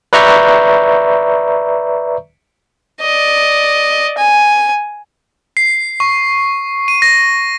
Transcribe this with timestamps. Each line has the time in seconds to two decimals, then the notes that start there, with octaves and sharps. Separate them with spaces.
0.13 B4 D5 E5 A#5 C#6 G6
3.02 D5 D#5
4.18 G#5
5.57 C7
6.00 C#6
6.88 D#7
7.02 A#6